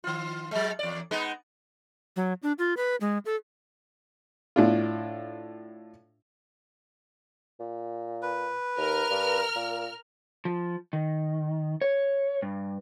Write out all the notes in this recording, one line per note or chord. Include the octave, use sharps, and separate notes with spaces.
D#3 F4
F#3 G#3
E2 D5
G#3 B3 D#4
F#3
D4
F4
B4
G#3
A4
A2 D4 F4
A#2
B4
D#2 A#4 F6
G2
A#2
F3
D#3
C#5
G2